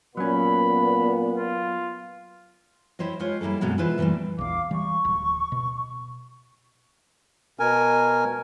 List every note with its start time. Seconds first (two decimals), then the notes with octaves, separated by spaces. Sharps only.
0.17 A#2 F#3 B3 C#4 B5
1.38 F4
2.99 E4 G4 C5 C#5 D#5
3.19 F3 G#3 F4 G4 C5 C#5
3.41 G3 A#3 E4 G#4 A4
3.61 F#2 B2 F#3 G#3 A#3 C4
3.78 E3 G#3 E4 F4 B4 C5
3.98 A#2 E3 F3 G3 A3
4.38 A#1 E2 F5 D6
4.71 E3 G3 C#6
5.05 D1
5.52 B2
7.59 B2 A#4 G#5